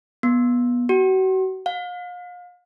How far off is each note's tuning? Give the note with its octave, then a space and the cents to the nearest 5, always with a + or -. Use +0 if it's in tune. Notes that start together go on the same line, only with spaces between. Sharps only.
B3 -20
F#4 +35
F5 +40